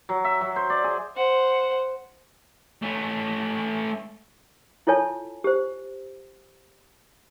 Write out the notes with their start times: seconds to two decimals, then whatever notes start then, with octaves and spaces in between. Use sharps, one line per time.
0.09 F#3
0.24 E5
0.41 F#3
0.56 C5
0.70 D5
0.84 G#4
1.16 C5 F#5
2.83 A3 C#4
4.87 E4 F4 A4 C#5 G#5 A5
5.44 G4 C5